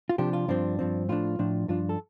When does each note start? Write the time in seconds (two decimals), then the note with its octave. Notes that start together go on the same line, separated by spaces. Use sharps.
0.09 F4
0.18 C3 F3 D4 G4
0.33 F4
0.48 G2 F3 C4 D4
0.79 G2 F3 C4
1.09 A2 F3 D4 F4
1.39 A2 F3 D4
1.68 G2 F3 D4 F4
1.89 A4